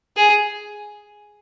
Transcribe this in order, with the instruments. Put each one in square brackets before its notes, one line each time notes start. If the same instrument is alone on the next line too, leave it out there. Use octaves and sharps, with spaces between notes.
[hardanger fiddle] G#4